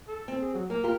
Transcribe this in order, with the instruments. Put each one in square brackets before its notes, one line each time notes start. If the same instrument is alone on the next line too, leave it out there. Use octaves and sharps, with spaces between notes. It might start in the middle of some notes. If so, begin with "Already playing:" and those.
[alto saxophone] A4
[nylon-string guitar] C4
[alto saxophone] G#4
F#3
[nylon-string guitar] A#3 [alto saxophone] A#4
[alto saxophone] F4 [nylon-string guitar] G4 A#4